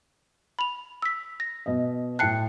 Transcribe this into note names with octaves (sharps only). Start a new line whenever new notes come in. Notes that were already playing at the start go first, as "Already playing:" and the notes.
B5 F7
E6 B6
A#6
B2 D#5
A2 G5 A5 F#6 C7 C#7